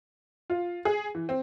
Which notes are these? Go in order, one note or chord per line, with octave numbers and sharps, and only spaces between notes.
F4
G#4
E3
C4